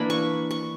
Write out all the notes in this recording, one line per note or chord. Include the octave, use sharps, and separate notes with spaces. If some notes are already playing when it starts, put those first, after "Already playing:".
Already playing: E3 A#3 D4 B5
C#6
C#6